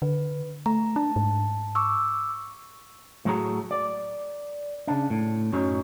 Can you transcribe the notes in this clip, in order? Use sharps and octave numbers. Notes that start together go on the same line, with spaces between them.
D3 B4
A3 A#5
D4 A5
G#2
C#6 D6 E6
A2 F#3 A3 F#4 G#4 A#5
D5
C#3 D4
A2
F#2 A2 F#3 C#4 D#4